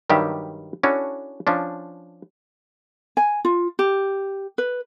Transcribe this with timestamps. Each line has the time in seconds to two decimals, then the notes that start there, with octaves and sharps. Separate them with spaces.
0.10 G2 D#3 F#3 G3 G4 E5
0.83 C#4 D4 E4 F#4 A4 C#5
1.47 F3 C#4 D4
3.17 G#5
3.45 F4
3.79 G4
4.58 B4